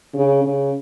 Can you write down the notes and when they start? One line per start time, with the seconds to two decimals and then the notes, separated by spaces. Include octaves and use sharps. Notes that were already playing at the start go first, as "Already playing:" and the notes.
0.14 C#3
0.44 C#3